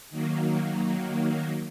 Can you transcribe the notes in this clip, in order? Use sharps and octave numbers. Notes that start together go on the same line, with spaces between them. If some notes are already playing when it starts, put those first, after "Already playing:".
D#3 F#3 A#3